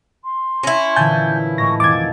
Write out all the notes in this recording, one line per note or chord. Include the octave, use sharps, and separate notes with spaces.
C6
C#4 E4 A#6
A#2 D3 E3 G#5 A5 G6
A2 G#3 A3 C#6 A#6
F2 B2 D#3 D6 G#6 A6